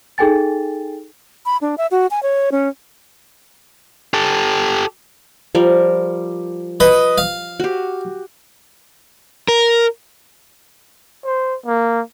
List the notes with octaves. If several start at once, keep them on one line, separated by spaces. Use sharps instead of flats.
D#4 G#4 A4 G5 G#5 A6
B5
D4
E5
F#4
G#5
C#5
C#4
G4 A4
F3 G3 A#4
B4 D#5
F5
F#4 G4
A#4
C5
A#3